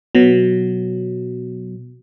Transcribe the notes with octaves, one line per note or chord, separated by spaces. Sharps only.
B2 F#3